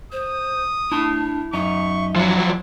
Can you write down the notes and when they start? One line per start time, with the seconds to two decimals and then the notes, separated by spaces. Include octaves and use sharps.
0.12 C5 D#6
0.92 D4 E4 A5
1.53 F#2 D#4 E5 C#6
2.16 F3 F#3 E4